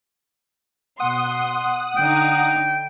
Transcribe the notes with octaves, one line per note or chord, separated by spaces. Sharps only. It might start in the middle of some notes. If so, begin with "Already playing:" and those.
B2 F#5 C6 D#6
D3 D#4 G5